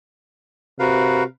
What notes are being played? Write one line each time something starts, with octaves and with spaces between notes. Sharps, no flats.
C3 F#4 A#4 B4 F5